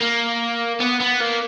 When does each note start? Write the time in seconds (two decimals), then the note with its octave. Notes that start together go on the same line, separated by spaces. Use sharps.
0.01 A#3
0.80 B3
1.00 B3
1.20 A#3